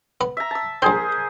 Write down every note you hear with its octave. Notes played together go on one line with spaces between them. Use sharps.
B3
E5 A#5
A5 E6
A#1 C4 G#4 A#4 C5